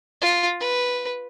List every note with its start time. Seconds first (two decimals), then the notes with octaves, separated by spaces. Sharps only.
0.21 F4
0.60 B4